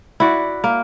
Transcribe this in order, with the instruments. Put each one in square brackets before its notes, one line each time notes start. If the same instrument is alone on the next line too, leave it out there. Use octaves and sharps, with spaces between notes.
[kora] E4 F#4 D5
A#3